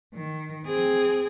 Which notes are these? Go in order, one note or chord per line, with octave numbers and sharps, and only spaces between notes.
D#3
C4 G#4